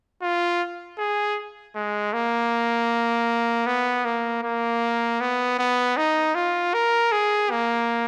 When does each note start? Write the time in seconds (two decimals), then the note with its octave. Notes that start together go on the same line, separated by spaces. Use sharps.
0.22 F4
0.98 G#4
1.75 G#3
2.13 A#3
3.66 B3
4.05 A#3
4.43 A#3
5.21 B3
5.59 B3
5.97 D#4
6.35 F4
6.74 A#4
7.12 G#4
7.51 A#3